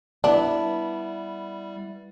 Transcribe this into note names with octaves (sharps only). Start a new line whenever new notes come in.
G3 B3 D4 E4